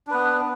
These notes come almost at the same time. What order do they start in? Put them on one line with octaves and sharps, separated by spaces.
D4 B4 B3